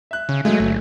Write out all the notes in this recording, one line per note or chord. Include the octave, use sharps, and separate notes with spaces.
E5 F#6
C#3
F#3 G#3 A3
G1